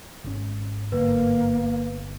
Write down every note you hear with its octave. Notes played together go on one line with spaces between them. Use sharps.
G#1 G#2 C#4
G1 A#3 B4